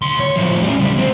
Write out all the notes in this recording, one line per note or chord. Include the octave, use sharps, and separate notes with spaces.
D2 C6
C#5
A2 F3
G3 C#4
C#2 G3
D2 C4